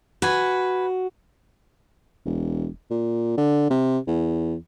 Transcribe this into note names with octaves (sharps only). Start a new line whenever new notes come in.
F#4 B4 G#5
E1
A#2
D3
C3
E2